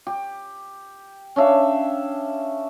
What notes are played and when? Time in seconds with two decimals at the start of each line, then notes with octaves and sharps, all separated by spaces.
0.07 G4
1.36 C#4 D4 E5 F5